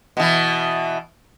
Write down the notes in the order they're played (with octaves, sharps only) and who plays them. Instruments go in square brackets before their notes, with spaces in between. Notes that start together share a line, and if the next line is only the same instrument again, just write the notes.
[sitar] B2 E3